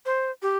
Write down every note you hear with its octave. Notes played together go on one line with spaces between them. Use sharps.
C5
G4